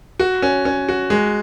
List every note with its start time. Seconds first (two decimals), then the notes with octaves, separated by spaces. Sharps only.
0.20 F#4
0.42 C#4
0.65 C#4
0.89 F#4
1.10 G#3